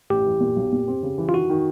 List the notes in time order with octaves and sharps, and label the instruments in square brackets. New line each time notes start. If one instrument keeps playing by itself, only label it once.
[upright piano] A1 [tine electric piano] G4
[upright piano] E3
A#2
B1
A#2
C4
C#3
E3
[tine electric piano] F4
[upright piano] D#3 [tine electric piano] F#4
[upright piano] D#3